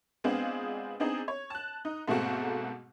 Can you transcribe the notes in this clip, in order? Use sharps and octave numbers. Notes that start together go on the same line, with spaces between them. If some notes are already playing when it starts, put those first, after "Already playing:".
G#3 B3 C4 D4 F4 G#4
B3 C4 D4 D#4 G#4
C#5
A5 F#6
D#4
G#2 B2 A3 A#3 C4 F#4